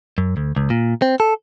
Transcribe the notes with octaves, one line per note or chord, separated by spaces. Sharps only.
F#2
D2
C#2
A#2
C4
A4